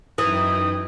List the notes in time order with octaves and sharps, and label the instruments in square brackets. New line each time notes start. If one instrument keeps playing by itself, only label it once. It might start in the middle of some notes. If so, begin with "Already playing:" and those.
[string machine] F#2 D#4 G5 [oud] E3 [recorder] D#6